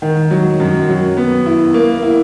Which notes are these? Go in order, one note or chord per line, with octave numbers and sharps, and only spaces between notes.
D#3
F#3
F#2
F#3
B3
E4
A#3
E4